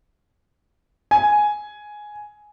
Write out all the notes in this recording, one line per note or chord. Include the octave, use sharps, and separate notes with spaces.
G#5